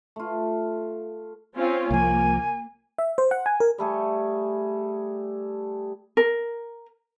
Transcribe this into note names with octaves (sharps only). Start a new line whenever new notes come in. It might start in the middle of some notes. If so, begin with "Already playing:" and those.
A3 F4
C4 C#4 F4
C2 F3 A#3 G#5
E5
C5
F#5
G#5
A#4
G3 A3 G#4
A#4